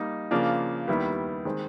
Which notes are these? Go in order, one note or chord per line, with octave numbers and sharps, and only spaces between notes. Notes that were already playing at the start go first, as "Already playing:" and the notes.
Already playing: G3 A#3 D#4
C#3 F3 A#3 D4 F4
D#2 D#3 G3 B3 E4
D#3 G#3 C4